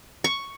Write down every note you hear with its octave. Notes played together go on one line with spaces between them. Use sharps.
C#6